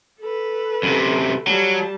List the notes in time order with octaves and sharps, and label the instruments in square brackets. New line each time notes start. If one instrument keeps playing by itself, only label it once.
[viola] A4 B4
[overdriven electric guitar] F#2 C3
[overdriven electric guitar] F#3 [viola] G3 A5